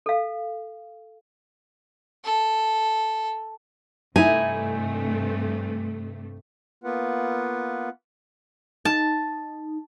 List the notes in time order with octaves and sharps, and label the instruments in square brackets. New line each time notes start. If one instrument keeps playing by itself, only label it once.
[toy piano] A4 F5
[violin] A4
[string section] G2 C3 A3 [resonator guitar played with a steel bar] D#4 E4 [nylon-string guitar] G#5
[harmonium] A#3 B3 F4 B4 F#5
[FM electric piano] D#4 [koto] A5